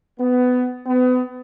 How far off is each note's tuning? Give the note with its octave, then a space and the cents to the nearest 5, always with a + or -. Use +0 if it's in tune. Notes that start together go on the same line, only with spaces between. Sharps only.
B3 +20
B3 +35